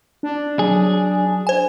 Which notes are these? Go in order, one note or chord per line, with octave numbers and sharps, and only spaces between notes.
D4
F#3 G#4
C5 G#5